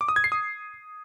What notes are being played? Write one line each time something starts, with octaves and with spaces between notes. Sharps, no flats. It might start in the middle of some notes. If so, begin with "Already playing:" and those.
D6
D#6
G#6
C7
D#6